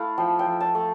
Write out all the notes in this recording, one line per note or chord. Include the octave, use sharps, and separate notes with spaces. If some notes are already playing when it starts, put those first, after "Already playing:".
Already playing: A3 E4 F5
F3 G5
G5
F3
A5
A3